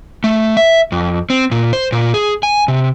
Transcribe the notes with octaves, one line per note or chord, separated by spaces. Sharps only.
A3
E5
F2
C4
A#2
C5
A#2
G#4
G#5
C3